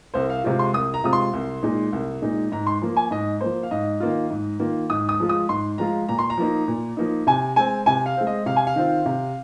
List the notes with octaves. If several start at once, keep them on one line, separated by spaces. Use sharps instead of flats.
C2 C5
F5
C3 G#3 C4 F4
C6
C2 D#6
A#5
C3 G#3 C4 F4 D#6
C6
C2
A#2 G#3 D#4
C2
A#2 G#3 D#4
G#2 A#5
C6
F3 A#3
G#5
G#2 D#5
F3 A#3 C5
F5
G#2 D#5
D#3 A#3 F4
G#2
D#3 A#3 F4
G#2 D#6
D#6
F3 G#3 F4
D#6
G#2 C6
F3 G#3 F4 A#5
A#2 A#5
C6
A#5
F3 A#3 D#4
A#2
F3 A#3 D#4
C3 G#5
G#3 C4 G#5
C3 G#5
F5
G#3 C4
D#5
C3 F5
G#5
F5
D#3 C4 F4
C3